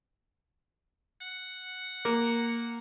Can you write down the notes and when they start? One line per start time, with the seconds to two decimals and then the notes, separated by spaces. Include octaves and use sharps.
1.22 F#5
2.05 A#3